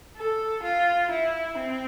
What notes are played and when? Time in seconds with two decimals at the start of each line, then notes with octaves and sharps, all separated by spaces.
0.17 A4
0.63 F4
1.11 E4
1.57 C4